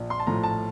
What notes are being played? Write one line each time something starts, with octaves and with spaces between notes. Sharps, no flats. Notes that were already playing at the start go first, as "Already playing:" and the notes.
Already playing: A#1
C6
A5
A2 F3 A#5
A5